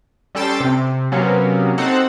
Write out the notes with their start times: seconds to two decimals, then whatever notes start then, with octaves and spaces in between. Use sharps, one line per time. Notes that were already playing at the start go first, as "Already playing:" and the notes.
0.35 G3 C#4 A4 G5 C6 A6
0.60 C3
1.12 C3 F#3 A#3 B3 C#4
1.78 C4 D#4 F#4 A4 F#5